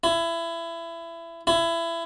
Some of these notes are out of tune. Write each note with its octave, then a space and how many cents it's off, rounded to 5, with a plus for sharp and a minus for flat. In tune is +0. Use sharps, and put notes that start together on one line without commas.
E4 +25
E4 +25